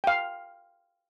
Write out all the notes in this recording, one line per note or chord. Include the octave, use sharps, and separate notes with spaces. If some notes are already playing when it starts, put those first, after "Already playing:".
F5 G5